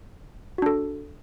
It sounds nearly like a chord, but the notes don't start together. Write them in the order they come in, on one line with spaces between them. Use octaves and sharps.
F#4 D4 A4